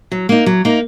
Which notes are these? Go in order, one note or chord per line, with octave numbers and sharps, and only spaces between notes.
F#3
A#3 D#4
F#3
A#3 D#4